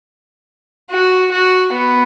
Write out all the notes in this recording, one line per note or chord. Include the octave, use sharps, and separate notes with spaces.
F#4
F#4
B3